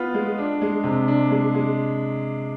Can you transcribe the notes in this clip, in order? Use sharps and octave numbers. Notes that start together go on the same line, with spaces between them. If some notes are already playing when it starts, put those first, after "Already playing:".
Already playing: B3 F4
G#3
D4
G#3
C3
D4
G#3
G#3